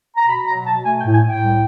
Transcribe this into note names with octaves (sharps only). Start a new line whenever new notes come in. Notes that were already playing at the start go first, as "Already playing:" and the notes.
A#5
B2 B5
F#3 A#5
B2 A5
A3 G#5
G5
A2
G#5
A2 G5
C2